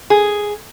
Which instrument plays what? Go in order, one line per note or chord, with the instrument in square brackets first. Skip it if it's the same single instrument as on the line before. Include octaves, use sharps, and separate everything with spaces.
[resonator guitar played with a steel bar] G#4